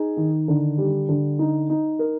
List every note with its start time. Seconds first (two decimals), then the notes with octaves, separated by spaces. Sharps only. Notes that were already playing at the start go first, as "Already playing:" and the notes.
Already playing: D#4 G#4
0.17 D#3
0.48 D3
0.78 G3
1.09 D3
1.39 D#4
1.70 D#4
1.99 A#4